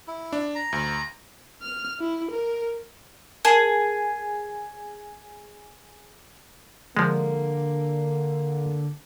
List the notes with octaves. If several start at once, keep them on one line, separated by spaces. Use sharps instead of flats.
E4
D4
A#5
D2
F6
E4
A#4
G#4 A#4 A5
D3 F3 G#3 A#3